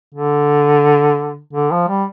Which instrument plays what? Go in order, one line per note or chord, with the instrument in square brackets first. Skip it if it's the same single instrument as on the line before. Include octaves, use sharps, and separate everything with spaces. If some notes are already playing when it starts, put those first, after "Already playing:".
[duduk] D3
D3
F3
G3